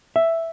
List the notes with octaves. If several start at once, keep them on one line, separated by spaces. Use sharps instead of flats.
E5